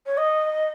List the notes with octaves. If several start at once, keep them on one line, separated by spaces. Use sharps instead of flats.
C#5
D#5